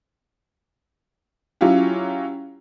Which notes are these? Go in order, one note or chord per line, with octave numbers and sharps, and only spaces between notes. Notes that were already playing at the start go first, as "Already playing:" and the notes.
F#3 C#4 E4 F4 G4